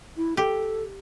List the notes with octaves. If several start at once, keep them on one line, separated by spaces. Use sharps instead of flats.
E4
G4 A4